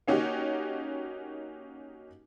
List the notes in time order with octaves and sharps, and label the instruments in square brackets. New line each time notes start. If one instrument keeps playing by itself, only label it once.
[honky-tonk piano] A#3 C#4 D#4 F#4 G4